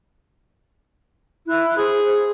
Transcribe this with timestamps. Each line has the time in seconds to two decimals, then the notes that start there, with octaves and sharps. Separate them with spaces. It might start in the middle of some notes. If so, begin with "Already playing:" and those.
1.48 E4 F#6
1.78 G#4 C5